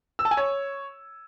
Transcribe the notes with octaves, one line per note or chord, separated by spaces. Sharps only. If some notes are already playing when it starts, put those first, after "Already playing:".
E6
A5
G#5
C#5